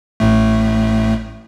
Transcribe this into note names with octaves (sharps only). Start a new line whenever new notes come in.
A1 A2 A3